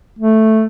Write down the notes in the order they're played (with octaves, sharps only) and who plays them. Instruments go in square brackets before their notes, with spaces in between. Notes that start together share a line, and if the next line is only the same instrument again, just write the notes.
[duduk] A3